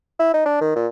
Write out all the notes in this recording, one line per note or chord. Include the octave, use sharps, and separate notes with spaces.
E4
D#4
D4
D#3
A#2